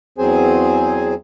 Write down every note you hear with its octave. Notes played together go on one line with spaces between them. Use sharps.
E2 F#3 C4 G#4 C5 G#5